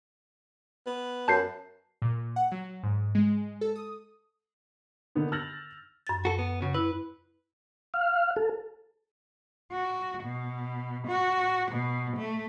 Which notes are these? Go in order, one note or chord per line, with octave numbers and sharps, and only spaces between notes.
B3
F#2 A5 G6 C7
A#2
F#5
F#3
G#2
G#3
A4
D#6
D3 A#3 B3 D#4
E6 F6 G6 A6 A#6 F#7
F#2 A6
F#4 A4
B3
C#3 F#4
E4 B4
F5
A4
F#4
B2
F#4
B2
A3